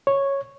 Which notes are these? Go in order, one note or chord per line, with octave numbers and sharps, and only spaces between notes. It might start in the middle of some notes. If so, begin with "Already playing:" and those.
C#5